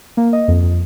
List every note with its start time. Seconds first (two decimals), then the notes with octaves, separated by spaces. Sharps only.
0.17 A#3
0.33 D#5
0.48 F2
0.63 F2